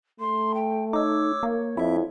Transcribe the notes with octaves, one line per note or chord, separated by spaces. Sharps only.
A3 C6
G5
D#4 C#5 D6 E6
A#3
F2 C4 E4 E5